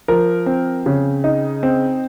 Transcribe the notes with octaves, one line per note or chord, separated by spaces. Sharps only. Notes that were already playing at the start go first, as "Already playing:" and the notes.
F3 A#4
C4
C#3
D#4
C4